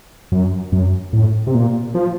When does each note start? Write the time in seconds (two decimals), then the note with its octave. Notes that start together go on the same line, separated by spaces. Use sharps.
0.32 F#2
0.72 F#2
1.13 A2
1.47 C3
1.55 A#2
1.95 F3